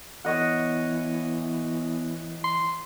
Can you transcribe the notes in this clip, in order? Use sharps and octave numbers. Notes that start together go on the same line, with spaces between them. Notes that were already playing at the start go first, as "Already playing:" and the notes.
E3 B3 C#5 D#5 F#5
C6